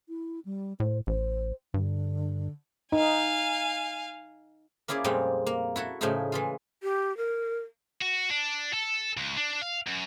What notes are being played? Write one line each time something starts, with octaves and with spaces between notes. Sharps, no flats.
E4
G3
A2 C5
A1 C5
G2 D3
D#4 F5 G#5
A#3 C#4 E4 G#4 D5
F2 A#2 G3 G#3 C4
A#3
E4 F#4 A4
A2 C#3 F3 A3 D#4 E4
E3 G#3 F4
G4
A#4
F#4
D4
A4
C#2
D4
F5
F#2